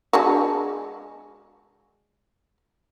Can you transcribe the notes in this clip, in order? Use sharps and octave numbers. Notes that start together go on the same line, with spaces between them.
G#3 D4 F#4